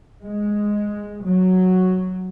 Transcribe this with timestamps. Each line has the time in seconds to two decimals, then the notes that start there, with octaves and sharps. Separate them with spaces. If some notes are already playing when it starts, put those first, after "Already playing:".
0.23 G#3
1.23 F#3